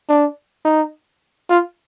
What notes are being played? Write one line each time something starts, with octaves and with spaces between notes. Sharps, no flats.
D4
D#4
F4